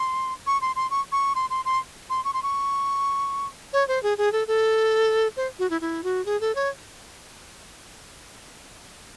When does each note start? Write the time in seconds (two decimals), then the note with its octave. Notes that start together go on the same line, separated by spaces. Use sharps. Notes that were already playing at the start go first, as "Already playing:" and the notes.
Already playing: C6
0.47 C#6
0.61 C6
0.76 C6
0.91 C#6
1.12 C#6
1.35 C6
1.50 C6
1.65 C6
2.10 C6
2.25 C#6
2.34 C6
2.43 C#6
3.73 C#5
3.88 C5
4.03 G#4
4.18 G#4
4.32 A4
4.48 A4
5.37 C5
5.59 F#4
5.70 E4
5.81 E4
6.04 F#4
6.26 G#4
6.41 A4
6.55 C#5